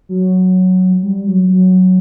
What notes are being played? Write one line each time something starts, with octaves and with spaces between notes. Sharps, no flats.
F#3
G3
F#3
F#3